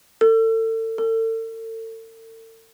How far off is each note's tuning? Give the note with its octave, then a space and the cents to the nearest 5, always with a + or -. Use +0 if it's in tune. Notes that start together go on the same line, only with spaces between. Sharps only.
A4 +35
A4 +40